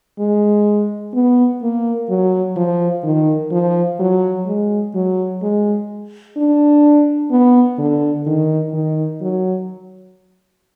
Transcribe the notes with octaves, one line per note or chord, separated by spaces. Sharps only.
G#3
B3
A#3
F#3
F3
D#3
F3
F#3
G#3
F#3
G#3
D4
B3
D3
D#3
D#3
F#3